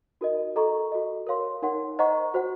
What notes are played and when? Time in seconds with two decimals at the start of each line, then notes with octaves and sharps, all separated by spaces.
0.21 D#4 F#4 A#4 D#5
0.56 A4 D#5 A#5 C#6
0.92 F#4 A4 D#5
1.27 A#4 C#5 F5 C6
1.62 D#4 A#4 C#5 F#5 C6
1.99 C5 D#5 F#5 A#5 C#6
2.34 F#4 C5 F#5